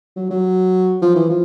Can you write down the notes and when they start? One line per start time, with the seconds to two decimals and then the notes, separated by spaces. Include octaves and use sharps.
0.16 F#3
0.30 F#3
1.02 F3
1.15 E3
1.30 F3